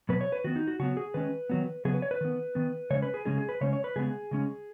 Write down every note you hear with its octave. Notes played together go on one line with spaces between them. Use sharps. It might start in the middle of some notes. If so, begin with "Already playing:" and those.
B2 F#3 B3 B4
C#5
B4
D#3 B3 F#4
D#4
F#4
C#3 F#3 B3 F#4
G#4
D#3 G#3 C#4 B4
D#3 F#3 B3
C#3 F#3 B3 G#4
B4
C#5
B4
D#3 B3
D#3 B3
C#3 G#3 C#4 C#5
B4
G#4
C#3 G#3 C#4 G#4
G#4
B4
C#3 G#3 C#4 C#5
C#5
B4
C#3 G#3 B3 G#4
C#3 G#3 C#4